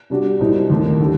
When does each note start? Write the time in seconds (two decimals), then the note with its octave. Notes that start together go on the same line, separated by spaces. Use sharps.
0.10 C3 G3 D4 F#4
0.39 C2 A#2 G3 C4 D#4
0.70 D#2 D#3 A3
1.01 D3 G3